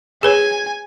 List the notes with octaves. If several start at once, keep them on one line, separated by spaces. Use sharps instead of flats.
G#4 B4 C#5 G#5